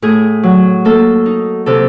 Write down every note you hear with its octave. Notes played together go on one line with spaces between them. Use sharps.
A2 G#4
F#3
A#3 A4
D#4
C3 A4